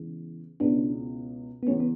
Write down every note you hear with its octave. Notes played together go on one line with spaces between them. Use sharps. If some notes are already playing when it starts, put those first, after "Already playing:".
Already playing: E2 C#3 E3 G#3
C#2 B2 G#3 B3 C#4 D4 E4
B3
E2 C#3 A3 C#4
B3